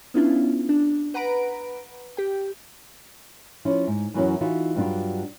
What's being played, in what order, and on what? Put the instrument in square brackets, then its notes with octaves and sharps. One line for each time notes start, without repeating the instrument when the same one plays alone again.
[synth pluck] B3 C#4 D4 E4 F4
D4
B4 F#5 A#5 B5 D7
G4 G5
[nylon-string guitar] F3 C#4 E4
G#2
F#2 E3 F#3 C#4 E4
E3 D#4 F4 F#4 E5
G2 F#3 G3 D4 F4